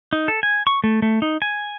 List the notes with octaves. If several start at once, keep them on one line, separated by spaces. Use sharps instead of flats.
D#4
A4
G#5
C#6
A3
A3
D#4
G#5